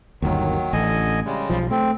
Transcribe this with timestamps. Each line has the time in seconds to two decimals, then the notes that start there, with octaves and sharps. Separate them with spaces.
0.22 G1 D#2 D#3 F#3
0.73 A1 D3 D#5 G#5
1.26 C#3 G3 G#3
1.50 B1 F3
1.71 A3 C4